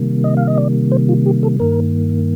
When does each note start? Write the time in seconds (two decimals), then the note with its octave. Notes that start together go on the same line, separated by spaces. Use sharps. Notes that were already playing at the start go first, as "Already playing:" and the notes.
Already playing: C3 D#3 G3 A#3
0.24 D#5
0.37 F5
0.47 D#5
0.58 D5
0.92 C5
1.09 F4
1.26 G4
1.43 A4
1.60 G2 D#3 A#3 A#4